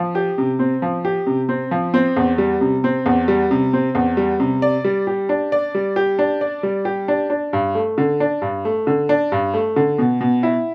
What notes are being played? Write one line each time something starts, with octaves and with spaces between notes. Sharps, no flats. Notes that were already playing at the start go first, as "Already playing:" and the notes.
Already playing: F3
G4
C3
C4
F3
G4
C3
C4
F3
C4
E2
G3
C3
C4
E2
G3
C3
C4
E2
G3
C3
D5
G3
G4
D4
D5
G3
G4
D4
D5
G3
G4
D4
D4
G2
A3
D3
D4
G2
A3
D3
D4
G2
A3
D3
B2
B2
E4